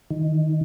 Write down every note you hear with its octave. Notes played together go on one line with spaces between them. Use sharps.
D#3